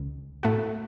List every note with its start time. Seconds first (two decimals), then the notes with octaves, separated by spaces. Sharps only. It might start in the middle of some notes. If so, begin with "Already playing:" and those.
Already playing: C#2 C#3
0.43 A2 A3 F#4